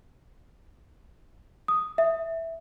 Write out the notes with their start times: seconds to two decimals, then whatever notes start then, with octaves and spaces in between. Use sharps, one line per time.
1.68 D#6
1.98 E5